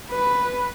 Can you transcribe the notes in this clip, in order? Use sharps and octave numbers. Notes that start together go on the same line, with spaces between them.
B4